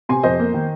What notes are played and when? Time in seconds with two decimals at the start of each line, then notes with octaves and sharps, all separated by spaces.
0.09 C3 G#5 C6
0.23 F2 C5 D#5
0.40 A#3
0.54 D#3